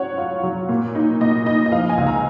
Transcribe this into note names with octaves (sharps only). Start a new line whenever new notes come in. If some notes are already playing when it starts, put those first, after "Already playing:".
Already playing: F#3 C#4 C#5 F#5
F4
F#3
A#2
D#4
A#2 D#5
D#4 D#5
D#5
F3 F5
G#5
C#2
A#5